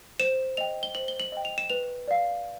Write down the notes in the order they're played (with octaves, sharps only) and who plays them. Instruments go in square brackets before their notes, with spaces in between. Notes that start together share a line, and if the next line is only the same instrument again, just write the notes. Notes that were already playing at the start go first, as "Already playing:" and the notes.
[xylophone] C5 E7
D#5 G5 F7
G7
C5 F#7
G7
F#7
D#5 G5
F7
E7
B4 F7
D5 F5